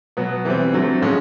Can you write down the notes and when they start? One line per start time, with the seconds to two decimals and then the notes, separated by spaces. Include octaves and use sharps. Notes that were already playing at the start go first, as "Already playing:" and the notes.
0.17 B2 F#3 B3
0.45 E3 G3 C4
0.73 D3 F#3 A3 C4
1.02 A2 F3 G#3 C#4